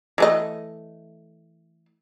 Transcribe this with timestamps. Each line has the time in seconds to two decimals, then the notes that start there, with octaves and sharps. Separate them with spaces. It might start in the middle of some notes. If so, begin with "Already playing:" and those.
0.18 E3 A3 D#5